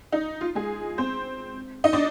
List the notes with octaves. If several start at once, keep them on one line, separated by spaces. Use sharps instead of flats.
D#4
F4
G#3 G#4
C4 C5
D#4 D#5
D4 D5